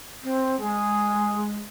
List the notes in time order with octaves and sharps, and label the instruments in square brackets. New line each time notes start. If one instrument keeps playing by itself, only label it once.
[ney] C4
[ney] G#3 [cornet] G#4